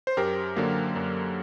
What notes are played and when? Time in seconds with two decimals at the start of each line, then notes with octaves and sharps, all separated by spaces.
0.07 C5
0.17 F#2 G4 A#4
0.56 D3 F#3 A#3
0.96 F#2